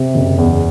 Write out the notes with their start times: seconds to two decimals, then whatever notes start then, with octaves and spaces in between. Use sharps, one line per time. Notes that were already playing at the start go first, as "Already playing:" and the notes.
Already playing: C3
0.15 F#1
0.38 E2